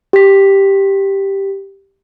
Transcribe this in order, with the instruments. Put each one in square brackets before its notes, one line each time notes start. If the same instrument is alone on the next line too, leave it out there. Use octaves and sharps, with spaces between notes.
[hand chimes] G4 B6